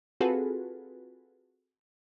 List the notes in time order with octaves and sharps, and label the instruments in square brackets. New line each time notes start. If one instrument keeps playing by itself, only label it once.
[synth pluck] C4 F4 F#4 G#4 A4 B4